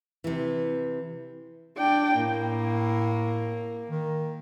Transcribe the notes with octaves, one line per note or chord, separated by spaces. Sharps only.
C3 E3
D4 D5 G5
A2 A#3
D#3